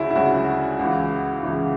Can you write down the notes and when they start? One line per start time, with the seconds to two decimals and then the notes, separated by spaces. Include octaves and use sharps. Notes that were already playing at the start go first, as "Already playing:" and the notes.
Already playing: D2 C#3 F#3 E4 F#4 G#4
0.11 E4
0.15 D2 C#3 F#3 F#4
0.79 C#2 C#3 E3
1.43 C#2 C#3 E3